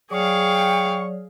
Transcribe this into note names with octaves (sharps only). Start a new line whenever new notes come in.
F#3 G#4 C#5 D5 F5 G5 C#6